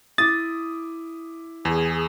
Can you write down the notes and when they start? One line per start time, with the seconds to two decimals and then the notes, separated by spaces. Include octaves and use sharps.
0.18 E4 D6 D#6 A6
1.65 E2 G#4